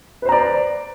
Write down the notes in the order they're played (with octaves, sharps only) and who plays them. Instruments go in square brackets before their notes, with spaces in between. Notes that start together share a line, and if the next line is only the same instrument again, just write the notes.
[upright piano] B4
C5
A#5
D5